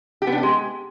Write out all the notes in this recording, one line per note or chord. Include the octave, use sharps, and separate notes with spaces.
G4
B3
D4
G4
G#3